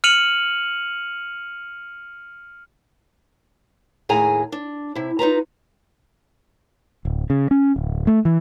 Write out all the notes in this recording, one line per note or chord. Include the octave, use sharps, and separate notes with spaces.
F6 C#7 D#7 F7 F#7
D#2 A2 A#3 G#4 G#5 A#5
D4
C3 E4
D#4 F4 B4 A#5
D1
C#3
C#4
D1
A3
E3